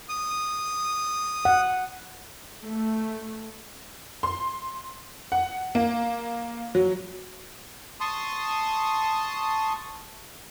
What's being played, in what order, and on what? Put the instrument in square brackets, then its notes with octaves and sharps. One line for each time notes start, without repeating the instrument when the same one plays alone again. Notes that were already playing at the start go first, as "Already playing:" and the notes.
[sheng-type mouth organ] D#6
[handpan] F#5
[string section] A3
[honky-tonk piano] C6
F#5
A#3
F#3
[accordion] A5 C6 C#6 D#6